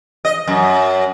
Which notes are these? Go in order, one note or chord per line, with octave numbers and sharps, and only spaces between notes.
D#5
F#2